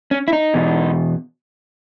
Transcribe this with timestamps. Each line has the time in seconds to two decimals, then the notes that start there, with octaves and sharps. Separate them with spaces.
0.11 C#4
0.28 E4
0.33 D#4
0.54 E2 B2